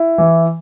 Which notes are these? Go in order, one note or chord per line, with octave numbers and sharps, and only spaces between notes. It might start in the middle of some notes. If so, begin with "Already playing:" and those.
Already playing: E4
E3